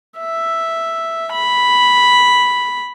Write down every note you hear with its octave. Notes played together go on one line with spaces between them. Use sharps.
E5
B5